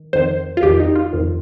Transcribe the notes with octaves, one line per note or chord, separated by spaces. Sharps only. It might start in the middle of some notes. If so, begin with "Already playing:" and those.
Already playing: D#3
F2 D#3 C5
F4
F2 D#3 G4
D#4
F4
F2 D#3